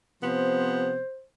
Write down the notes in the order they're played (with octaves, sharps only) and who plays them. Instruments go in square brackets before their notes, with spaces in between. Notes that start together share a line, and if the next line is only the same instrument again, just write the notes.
[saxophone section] C3 F3 B3 [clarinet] C5